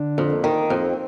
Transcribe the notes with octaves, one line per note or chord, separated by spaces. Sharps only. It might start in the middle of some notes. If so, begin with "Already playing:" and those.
Already playing: D3 D4
F2
A#3
D#3
F2 C4